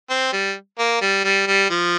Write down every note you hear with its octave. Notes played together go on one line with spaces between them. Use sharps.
C4
G3
A#3
G3
G3
G3
F3